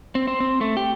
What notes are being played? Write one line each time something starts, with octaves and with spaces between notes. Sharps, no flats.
C4
C4
C4
A3
G4